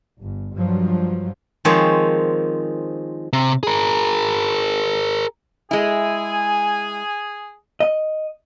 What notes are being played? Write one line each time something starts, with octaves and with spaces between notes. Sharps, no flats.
G1
G2 F3 F#3
D#3 F3 G#3 C4 C#5
C3
G#4 A#4
G#3 E4 G#4 G#5
D#5